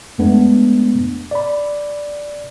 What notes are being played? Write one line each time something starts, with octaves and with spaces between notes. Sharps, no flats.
F2 G#3 A3 B3 D4
D5 B5